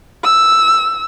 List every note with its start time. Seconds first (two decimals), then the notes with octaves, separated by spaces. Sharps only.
0.24 E6